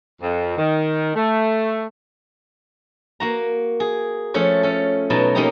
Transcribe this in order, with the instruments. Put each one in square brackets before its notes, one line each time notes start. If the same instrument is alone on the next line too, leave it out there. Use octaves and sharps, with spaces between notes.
[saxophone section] F2
D#3
A3
[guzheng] A#3 F#4 A#5
G#4
F3 A3 C#4 A4 C#5
C#4 A4
B2 F#3 D#4 A5
A#3 C#4 D#4 G4 D#5 A#5